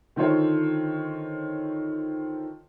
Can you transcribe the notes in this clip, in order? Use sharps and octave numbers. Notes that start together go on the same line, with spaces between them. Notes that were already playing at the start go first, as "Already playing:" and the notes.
D3 D#3 F4 C5 C#5